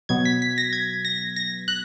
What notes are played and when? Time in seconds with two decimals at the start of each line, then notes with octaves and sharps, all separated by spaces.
0.09 B2 F#3 B3 G#6
0.25 B6
0.42 B6
0.58 A#6
0.73 G#6
1.05 A#6
1.36 A#6
1.68 F#6